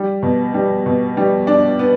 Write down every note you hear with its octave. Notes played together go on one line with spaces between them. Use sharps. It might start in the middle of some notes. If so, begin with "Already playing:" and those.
Already playing: G3
B2
G3
B2
G3
D4
B3